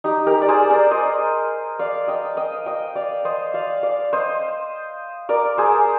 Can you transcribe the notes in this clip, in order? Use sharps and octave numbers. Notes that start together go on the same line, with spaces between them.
D#4 G4
G4 A#4
D5
G#4 C5
A#4 D5
C5 D#5
D5 F5
D#5 G5
D#5 G5
D#5 G5
D5 F5
C5 D#5
D5 F5
D5 F5
C5 D#5
A#4 D5
G#4 C5